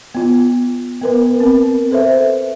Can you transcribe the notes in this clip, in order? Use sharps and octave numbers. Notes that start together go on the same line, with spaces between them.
B3 F4
B3 A#4 B4
C4 A#4
A4 B4 C5 E5